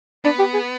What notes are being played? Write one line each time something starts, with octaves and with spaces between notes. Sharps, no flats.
B3 D4
G4
G#4